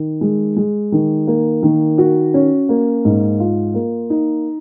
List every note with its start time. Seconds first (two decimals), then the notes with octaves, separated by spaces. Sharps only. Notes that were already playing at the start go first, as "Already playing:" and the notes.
Already playing: D#3
0.21 G#3
0.57 G#3
0.92 D#3
1.27 A#3
1.63 D#3
1.98 F#4
2.34 C#4
2.69 A#3
3.05 G#2
3.40 F4
3.74 A#3
4.10 D#4